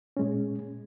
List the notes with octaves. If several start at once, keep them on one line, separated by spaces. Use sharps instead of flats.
A#2 G#3 C#4